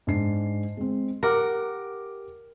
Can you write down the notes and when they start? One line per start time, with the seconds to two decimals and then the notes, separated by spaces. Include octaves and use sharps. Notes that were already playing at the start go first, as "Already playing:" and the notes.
0.07 G#2 D4 C7
0.77 G#3 C4
1.23 G4 A#4 F#5 D6